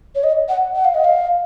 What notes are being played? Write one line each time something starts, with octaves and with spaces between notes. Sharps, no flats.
C#5
D#5
F#5
F#5
F5
D#5
F5